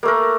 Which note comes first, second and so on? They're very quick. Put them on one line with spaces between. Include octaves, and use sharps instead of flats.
A#3 A3 A#4